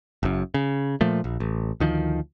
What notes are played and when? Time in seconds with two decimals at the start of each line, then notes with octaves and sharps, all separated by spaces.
0.23 F#1 F#2
0.54 C#3
1.01 A#2 F3 A3
1.24 A#1
1.40 A1
1.80 D2 D#3 F3